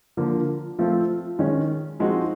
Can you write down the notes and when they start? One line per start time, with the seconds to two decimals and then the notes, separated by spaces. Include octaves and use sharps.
0.17 D3 F3 A#3
0.79 F3 A3 C4 F4
1.39 D#3 G#3 C#4
2.00 F3 G#3 C4 D#4 F#4